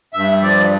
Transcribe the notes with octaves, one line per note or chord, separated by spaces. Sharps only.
G2 E5
F3 D5